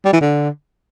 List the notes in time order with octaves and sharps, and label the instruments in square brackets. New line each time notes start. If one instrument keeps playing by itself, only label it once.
[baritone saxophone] G3
E3
D3